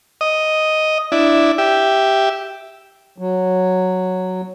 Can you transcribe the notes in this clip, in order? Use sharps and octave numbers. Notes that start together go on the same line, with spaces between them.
D#5
D4 E4
G4 E5
F#3